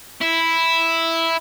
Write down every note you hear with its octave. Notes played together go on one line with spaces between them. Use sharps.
E4